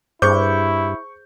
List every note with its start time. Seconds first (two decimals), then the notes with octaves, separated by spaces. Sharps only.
0.22 G2 E4 G#4 C5 C#6 G6